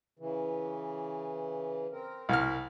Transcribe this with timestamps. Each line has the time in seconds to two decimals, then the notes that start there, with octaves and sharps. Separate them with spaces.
0.19 C#3 E3
1.92 C4 A#4
2.29 C2 F6